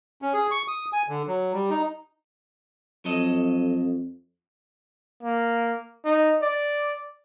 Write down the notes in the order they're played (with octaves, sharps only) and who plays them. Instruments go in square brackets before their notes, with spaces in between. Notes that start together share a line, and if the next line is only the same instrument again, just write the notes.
[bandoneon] C#4
G#4
C#6
D#6
G#5
D3
F#3
G3
D#4
[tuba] F2 [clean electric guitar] F#3 A4 D#5
[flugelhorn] A#3
D#4
D5